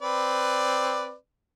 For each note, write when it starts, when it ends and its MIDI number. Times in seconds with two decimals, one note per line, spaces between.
0.02 1.14 60
0.02 1.14 71
0.02 1.14 74